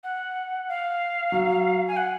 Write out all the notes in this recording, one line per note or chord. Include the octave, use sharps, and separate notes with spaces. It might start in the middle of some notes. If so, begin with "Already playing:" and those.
F#5
F5
F#3
G#5
F#5